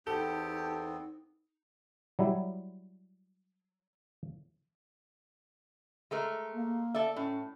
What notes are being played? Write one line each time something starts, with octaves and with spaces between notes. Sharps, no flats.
E2 B3 C4 D#4 G4 A4
F#3 G3 E4
G#3 A3 A#4
A#3
A4 D5 E5
A2 C#4